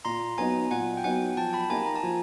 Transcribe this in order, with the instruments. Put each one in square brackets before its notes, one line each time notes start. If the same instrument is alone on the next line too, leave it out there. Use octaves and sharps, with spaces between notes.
[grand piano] A#2 [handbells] A#5 C6
[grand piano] F#3 B3 D#4 [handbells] G#5 A#5
[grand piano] A#2 [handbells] F#5 G#5
[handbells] G5
[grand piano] F#3 B3 D#4 [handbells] F#5 G#5
[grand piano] F3 [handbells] G5 A5
[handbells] A5 B5
[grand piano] A#3 D#4 G4 [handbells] G#5 A#5
[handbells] A#5
A5
[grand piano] F3 [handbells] G#5